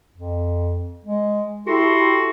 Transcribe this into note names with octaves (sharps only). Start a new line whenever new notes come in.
F2
G#3
E4 F#4 G4 A4 C6